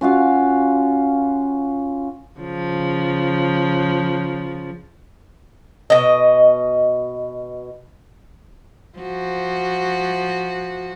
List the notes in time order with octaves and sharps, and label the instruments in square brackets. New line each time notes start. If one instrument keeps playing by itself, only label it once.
[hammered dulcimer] C#4 F4 F#4 F5
[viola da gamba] C#3 F3
[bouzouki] B2 D#5
[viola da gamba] F3 F#4